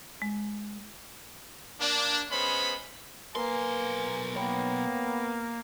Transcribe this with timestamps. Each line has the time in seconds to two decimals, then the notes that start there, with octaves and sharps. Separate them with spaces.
0.22 G#3
1.81 A#3 D4
2.30 G#3 B3 C#4 C5 B5
3.35 B1 A#3 A#4 B4 G#5 A#5 C6
4.36 A#3 B3 C#5 G5 B5